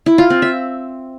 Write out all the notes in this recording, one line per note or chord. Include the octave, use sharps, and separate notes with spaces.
E4
F4
C4
E5